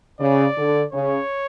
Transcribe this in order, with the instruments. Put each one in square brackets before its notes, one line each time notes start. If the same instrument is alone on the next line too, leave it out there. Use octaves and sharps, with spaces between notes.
[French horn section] C#3 [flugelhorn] D5
[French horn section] D3
[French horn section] C#3 [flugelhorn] C#5